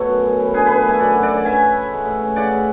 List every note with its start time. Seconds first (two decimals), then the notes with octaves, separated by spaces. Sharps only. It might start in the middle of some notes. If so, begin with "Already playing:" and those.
Already playing: B2 A3 F#4 C#5
0.09 F#2
0.24 F#2
0.40 E3
0.54 D4 G#4 B4
0.66 D3 G#4 B4
0.85 A3 E5 G#5
0.99 F#2 D5 F#5
1.15 F#2
1.23 D5 F#5
1.31 E3
1.45 C#4 E5 G#5
1.60 E4
1.76 A3
1.91 G#3
2.05 A2
2.21 C#4
2.36 C#3 D5 F#5
2.51 C#3